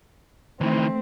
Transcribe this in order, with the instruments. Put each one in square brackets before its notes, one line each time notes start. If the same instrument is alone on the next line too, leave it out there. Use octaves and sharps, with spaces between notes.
[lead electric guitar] D#3 E3 [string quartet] A3 C4